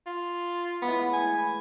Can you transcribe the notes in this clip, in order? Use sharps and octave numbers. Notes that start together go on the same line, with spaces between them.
F4
A2 E3 G#3 B3
G#5